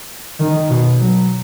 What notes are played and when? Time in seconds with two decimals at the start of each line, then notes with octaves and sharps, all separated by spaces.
0.40 D#3
0.70 B2
0.99 F#3